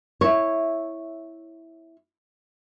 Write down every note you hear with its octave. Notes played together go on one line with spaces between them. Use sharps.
E4 C#5